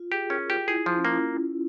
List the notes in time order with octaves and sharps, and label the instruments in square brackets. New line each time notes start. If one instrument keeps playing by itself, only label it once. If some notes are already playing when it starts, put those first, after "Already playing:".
Already playing: [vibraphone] F4
[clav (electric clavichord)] G4 [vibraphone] G#4
[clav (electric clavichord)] C#4 [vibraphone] A#4
[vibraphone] F4 [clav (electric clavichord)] G4
[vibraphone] F4
[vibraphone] E4 [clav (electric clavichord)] G#4
[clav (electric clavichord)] F3 [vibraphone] E4
[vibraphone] C#4
[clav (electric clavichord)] A#3 [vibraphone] E4
[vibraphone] F4